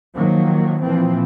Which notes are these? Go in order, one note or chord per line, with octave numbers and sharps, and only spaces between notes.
D#3 F3 F#3 A#3
A#2 E3 F3 C4